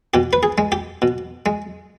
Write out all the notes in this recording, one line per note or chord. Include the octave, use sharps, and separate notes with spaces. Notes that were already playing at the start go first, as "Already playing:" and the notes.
B2 G4
B4
G#4
G#3
G4
B2
G#3